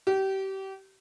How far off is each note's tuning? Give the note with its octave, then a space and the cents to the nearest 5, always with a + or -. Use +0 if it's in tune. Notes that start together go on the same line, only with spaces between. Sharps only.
G4 -30